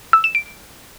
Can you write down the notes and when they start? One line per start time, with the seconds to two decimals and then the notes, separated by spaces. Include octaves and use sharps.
0.13 E6
0.24 E7
0.35 D7